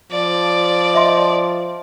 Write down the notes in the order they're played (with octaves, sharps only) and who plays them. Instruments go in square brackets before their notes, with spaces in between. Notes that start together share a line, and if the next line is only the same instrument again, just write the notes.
[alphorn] F3 [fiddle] D5
[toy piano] D#5 E5 C6